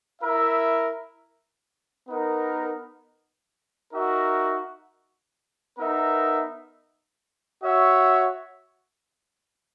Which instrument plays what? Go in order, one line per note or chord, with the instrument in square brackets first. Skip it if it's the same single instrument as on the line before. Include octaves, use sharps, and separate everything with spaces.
[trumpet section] E4 A#4 E5
B3 D#4 A#4
D#4 F#4 A#4 E5
B3 D#4 A#4 E5
F#4 C#5 E5